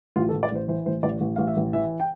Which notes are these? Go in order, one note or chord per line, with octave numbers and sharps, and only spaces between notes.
A1 F4
A4
A1
D5
A1 C5
E3 C5
A1 C5
A1 D5
A1
A1 F5
E5
A1
E3 E5
G5